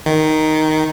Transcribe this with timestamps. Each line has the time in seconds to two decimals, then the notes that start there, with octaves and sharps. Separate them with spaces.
0.06 D#3